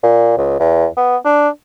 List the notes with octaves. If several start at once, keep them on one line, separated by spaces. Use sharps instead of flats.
A#2
C#2
E2
B3
D4